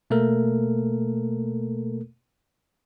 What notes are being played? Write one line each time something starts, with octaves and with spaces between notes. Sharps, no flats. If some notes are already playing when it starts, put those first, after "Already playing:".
B2 A3 A#3 A4 A#4